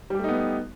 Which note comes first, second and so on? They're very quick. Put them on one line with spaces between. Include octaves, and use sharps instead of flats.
G3 G4 A3 D#4 B3